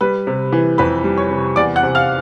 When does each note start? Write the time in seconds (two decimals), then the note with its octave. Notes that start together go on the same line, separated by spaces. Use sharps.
0.01 G3 B4 B5
0.27 C3
0.52 E3
0.78 F2 B4 B5
1.04 G3
1.17 C#5 C#6
1.31 C3
1.56 E2 D5 D6
1.76 F#5 F#6
1.83 C3
1.95 F5 F6